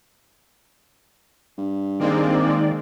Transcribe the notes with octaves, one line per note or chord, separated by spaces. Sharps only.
G2
D#3 G#3 A#3 C4 D5